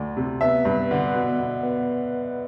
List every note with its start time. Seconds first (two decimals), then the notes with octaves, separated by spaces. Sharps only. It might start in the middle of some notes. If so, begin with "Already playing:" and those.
Already playing: D2 A3 D5
0.17 C3
0.41 B3 E5
0.65 G2
0.91 D3
1.15 B2
1.39 B2
1.63 B3